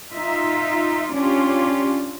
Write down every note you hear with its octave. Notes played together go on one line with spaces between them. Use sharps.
D#4 F4 E5
C#4 D4 F4 G4